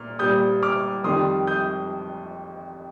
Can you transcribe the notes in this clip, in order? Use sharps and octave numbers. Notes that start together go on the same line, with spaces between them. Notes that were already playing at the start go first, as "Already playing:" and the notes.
Already playing: A#2 F6
A#2 G3 D#6 G6
D6 F6
F2 D#3 G3 C6 D#6
D#6 G6